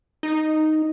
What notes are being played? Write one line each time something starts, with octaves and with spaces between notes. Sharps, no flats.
D#4